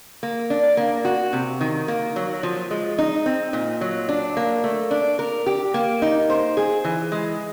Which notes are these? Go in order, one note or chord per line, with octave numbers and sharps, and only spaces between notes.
A#3
D4
A#3
F#4
C3
D#3
A#3
F#3
F3
G#3
D#4
C4
A#2
F#3
D4
A#3
A3
D4
A#4
G4
A#3
D#4
C5
G#4
E3
G#3